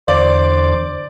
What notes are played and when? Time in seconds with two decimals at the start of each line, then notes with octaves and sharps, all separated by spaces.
0.08 E2 D3 C5 D5 D6